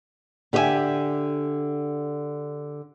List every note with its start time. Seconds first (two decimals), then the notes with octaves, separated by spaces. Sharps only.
0.53 D3 G4 C#5 D#5 E5 G#5